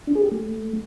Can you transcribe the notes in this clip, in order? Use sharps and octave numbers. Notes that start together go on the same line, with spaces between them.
D4
G#4
G4
A3